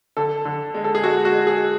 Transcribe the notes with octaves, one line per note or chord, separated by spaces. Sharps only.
D3 A4
D3
G#3
A4
G#4
G#3 F#4
F#4
G#3
G#4